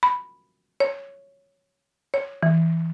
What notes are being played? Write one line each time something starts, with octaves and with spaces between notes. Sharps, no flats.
B5
C#5
C#5
E3